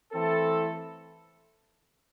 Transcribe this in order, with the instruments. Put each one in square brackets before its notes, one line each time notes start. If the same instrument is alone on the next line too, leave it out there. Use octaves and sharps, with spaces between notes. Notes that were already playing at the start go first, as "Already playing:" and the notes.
[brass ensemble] E3 A3 C4 E4 A4